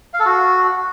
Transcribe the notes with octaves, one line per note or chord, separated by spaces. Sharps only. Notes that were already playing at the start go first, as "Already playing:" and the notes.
F5
A4
F#4